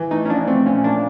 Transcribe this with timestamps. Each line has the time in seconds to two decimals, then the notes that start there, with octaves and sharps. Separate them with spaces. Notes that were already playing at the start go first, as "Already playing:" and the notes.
Already playing: E3
0.11 A3 D#4
0.25 C#4
0.29 F3 D4
0.47 A3 C4
0.66 A#2 C#4
0.84 A#3 D4